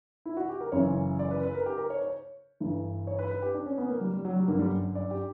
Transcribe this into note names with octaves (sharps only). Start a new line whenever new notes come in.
E4
F#4
G4
A#4
F#1 F#2 C#3 E3 C#5
D5
B4
B4
A#4
G4
A#4
C#5
C#5
G1 G2 E3
C#5
B4
B4
G4
D4
C#4
B3
A#3
G3
G3
F#3
G3
G1 F#2 D3 A#3
G3
D5
G4